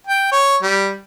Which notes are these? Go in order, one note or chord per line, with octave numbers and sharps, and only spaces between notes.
G5
C#5
G3